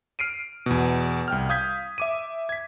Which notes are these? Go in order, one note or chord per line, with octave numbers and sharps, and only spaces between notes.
F6 C7 D7 D#7
E2 B2
C2 G5 F6
F5 D#6 G6 G#6 B6
E5 D6 D#7
G#6 B6